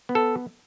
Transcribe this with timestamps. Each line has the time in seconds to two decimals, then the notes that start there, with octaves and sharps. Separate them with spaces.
0.09 B3
0.15 A4